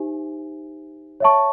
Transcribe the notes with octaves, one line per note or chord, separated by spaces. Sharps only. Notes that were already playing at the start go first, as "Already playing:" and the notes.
Already playing: D#4 G4 C5 E5 G#5
C#5 E5 A5 C#6